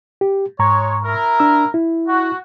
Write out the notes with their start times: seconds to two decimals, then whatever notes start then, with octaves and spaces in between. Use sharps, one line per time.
0.21 G4
0.59 G#2 G#3 C#5 A#5 C#6
1.03 E4 A#4
1.40 D4 E6
1.74 E4
2.08 F#4